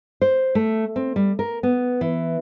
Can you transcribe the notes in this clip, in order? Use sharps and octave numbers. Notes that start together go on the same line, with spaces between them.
C5
A3
C4
G3
A#4
B3
E3